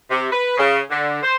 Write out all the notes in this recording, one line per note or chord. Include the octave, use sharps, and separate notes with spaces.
C3
B4
C#3
D3
C5